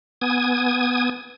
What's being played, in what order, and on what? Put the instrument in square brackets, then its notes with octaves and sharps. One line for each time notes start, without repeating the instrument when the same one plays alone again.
[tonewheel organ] B3 G#5 D#6 G#6